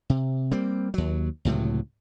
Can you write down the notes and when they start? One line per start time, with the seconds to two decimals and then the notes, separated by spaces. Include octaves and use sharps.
0.10 C3
0.51 G3 A#3 C4
0.94 D#2 F#3
1.45 C#2 A2 C3 F#3